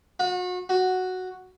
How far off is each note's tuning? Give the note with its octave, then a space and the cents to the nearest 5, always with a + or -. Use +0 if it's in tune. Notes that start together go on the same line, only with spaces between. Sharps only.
F#4 -35
F#4 +0